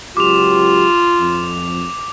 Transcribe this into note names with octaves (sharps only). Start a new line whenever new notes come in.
C#2 F#3 F4 G4 D6 F7
F2